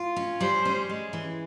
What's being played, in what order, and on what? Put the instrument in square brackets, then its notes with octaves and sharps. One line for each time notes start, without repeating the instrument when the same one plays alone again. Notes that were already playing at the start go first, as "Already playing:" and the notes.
Already playing: [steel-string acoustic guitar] F4
C#4
[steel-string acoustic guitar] G3 [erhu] C5
[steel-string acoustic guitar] C#4
G#3
E3